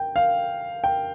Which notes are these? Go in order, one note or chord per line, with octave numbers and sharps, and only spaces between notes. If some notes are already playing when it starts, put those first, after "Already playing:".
Already playing: G5
F5
G5